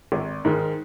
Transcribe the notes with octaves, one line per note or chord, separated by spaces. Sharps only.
G#1
G#2 D#3 G#3